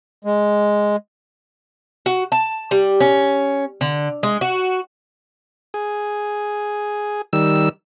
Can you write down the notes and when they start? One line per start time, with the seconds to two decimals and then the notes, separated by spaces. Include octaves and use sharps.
0.25 G#3
2.06 F#4
2.32 A5
2.71 G3
3.00 C#4
3.81 D3
4.23 G#3
4.41 F#4
5.74 G#4
7.33 D#3 G3 E6